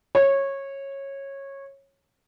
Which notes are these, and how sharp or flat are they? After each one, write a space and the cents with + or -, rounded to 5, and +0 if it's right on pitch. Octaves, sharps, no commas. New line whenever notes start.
C#5 -15